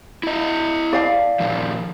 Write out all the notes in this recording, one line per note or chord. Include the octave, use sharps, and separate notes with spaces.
E4 D#5
D5 F5 A5
A#2 D#3 F3